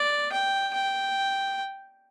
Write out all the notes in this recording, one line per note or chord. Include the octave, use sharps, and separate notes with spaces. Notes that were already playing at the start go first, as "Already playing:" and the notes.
Already playing: D5
G5
G5